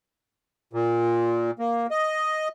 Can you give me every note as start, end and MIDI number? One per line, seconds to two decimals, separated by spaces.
0.73 1.51 46
1.59 1.87 58
1.91 2.48 75